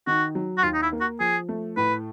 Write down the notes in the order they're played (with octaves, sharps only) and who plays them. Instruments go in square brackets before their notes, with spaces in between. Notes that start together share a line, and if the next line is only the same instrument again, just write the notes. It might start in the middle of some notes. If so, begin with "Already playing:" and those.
[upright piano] D#3 [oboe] F#4
[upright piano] F#3
[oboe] F#4
[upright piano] D#2 [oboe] F4
[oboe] D#4
E4
[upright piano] A#3
[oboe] F#4
[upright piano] F3 [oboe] G#4
[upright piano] A3
[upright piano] A2 [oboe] B4